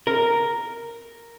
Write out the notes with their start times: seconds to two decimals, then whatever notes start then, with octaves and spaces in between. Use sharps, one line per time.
0.07 A#4